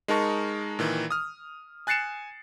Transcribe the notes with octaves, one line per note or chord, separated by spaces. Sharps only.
G#3 D#4 A#4 A5 C#6
A#2 D#3 E3
D#6 F6
G#5 F#6 A6 C7 C#7 E7